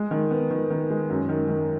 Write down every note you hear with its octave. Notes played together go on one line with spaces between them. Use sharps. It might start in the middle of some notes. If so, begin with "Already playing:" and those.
Already playing: G#3
D#3
B3
D#3
D#3
G#3
F#2
D#3
D#3